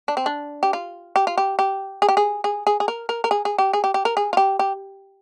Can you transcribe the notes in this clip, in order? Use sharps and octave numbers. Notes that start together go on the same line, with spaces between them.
D4
C4
D4
G4
F4
G4
F4
G4
G4
G#4
G4
G#4
G#4
G#4
G#4
A#4
A#4
A#4
G#4
G#4
G4
G#4
G4
G4
A#4
G#4
F4
G4
G4